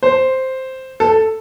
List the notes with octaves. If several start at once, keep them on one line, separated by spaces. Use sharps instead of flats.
C5
A4